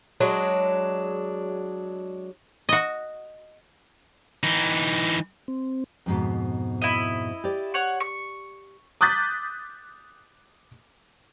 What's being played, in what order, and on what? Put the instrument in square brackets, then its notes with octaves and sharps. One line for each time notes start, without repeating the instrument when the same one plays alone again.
[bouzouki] F#3 G#3 D4
[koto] F#4 D#5
[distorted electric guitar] E3 D#4
[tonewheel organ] C4
[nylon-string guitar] F2 G#2 B2
[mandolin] E4 D#5
[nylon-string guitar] G4 D5
[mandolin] C#5 F#5 C#6
C#6
[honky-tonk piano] D6 D#6 F#6 G6 A6 B6